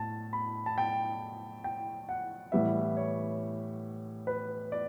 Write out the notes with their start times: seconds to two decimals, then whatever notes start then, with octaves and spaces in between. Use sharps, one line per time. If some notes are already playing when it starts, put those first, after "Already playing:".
Already playing: A2 A5
0.33 B5
0.66 A5
0.78 G5
1.64 G5
2.09 F#5
2.52 A2 E3 G3 B3 E5
2.97 C#5
4.27 B4
4.72 D5